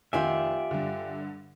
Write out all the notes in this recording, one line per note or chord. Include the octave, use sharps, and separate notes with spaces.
F1 D#3 F4 G4 D5 E5 G#5
G2 D3